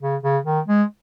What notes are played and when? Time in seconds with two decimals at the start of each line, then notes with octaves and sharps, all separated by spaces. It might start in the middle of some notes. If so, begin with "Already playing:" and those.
0.01 C#3
0.23 C#3
0.45 D#3
0.68 G#3